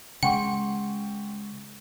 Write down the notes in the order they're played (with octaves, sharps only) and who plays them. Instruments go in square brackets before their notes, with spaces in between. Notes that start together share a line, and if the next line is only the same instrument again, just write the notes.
[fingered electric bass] C#3 G#3 [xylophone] F#5 [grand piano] G5 C6 C#6